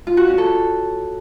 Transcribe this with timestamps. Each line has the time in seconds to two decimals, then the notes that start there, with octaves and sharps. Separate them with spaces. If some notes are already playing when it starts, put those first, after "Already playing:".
0.07 F4
0.17 F#4
0.28 C#4
0.38 A4